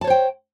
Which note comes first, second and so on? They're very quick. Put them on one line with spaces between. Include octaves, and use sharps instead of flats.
A5 C#5 C5 G5